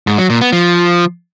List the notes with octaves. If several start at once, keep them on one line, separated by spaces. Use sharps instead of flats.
G#2
F#3
A#2
B3
F3